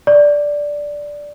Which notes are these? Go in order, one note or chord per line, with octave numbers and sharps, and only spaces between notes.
D5